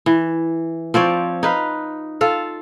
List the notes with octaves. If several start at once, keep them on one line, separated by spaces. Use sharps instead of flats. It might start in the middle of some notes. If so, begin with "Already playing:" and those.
E3
F3 C4 C#5 D5
D#4 B4 F5
F4 A4 F5